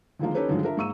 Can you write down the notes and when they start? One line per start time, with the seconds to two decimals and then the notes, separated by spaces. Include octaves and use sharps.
0.19 D3 D#3 F3 G#3 A#3 F4
0.34 C#4 D#4 G4 A4 B4 C#5
0.48 G2 D3 D#3 F3 F#3 G#3
0.63 D4 F4 A#4 E5
0.77 G#2 A#3 C#6 E6 D#7